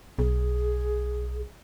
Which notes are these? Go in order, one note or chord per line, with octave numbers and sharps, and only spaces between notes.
B1 G#4